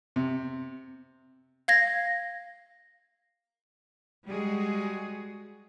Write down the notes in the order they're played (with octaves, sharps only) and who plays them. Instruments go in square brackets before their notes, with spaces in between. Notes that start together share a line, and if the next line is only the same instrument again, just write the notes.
[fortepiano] C3
[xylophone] F5 G#6 A#6
[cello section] G3 G#3 F#4 G#4